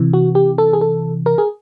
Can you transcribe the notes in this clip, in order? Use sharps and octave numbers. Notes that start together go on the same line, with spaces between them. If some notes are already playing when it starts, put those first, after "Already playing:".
Already playing: C3 E3
F#4
G4
A4
G#4
A4
A#4
G#4